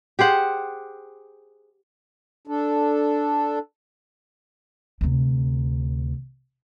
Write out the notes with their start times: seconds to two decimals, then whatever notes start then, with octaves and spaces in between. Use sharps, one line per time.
0.19 G4 G#4 C5 F#5
2.47 D4 A4
5.01 D2 C3